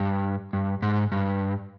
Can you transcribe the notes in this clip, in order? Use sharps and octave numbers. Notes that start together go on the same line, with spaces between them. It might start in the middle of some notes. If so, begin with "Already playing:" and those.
Already playing: G2
G2
G#2
G2